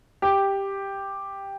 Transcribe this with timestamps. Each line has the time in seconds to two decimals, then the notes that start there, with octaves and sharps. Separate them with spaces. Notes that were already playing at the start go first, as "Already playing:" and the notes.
0.22 G4